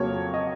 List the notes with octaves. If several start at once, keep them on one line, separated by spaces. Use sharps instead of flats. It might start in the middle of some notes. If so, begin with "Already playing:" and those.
Already playing: F2 C#3 F#3 A#3 C#5
D#5